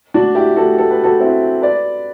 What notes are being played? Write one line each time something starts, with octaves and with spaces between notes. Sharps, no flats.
D4 F#4
E4 G4
F#4 A4
A4
B4
F#4 A4
C4 E4
B4 D5